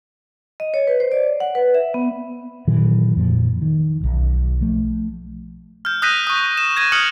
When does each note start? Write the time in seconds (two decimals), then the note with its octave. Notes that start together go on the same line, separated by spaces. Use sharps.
0.60 D#5
0.74 C#5
0.87 B4
1.00 C5
1.12 D5
1.40 F#5
1.55 B4
1.75 E5
1.94 B3
2.68 A#2 D#3 E3 F#3
3.16 F2 A#2 F3
3.62 D#3
4.00 D1 B1
4.61 F3 A3
5.85 F6 G6
6.02 D#6 F#6 G6 A#6 B6 D#7
6.27 C#6 D#6
6.57 E7
6.77 G#6 A#6 D#7 E7
6.92 D#6 F6 F#6 C#7 F#7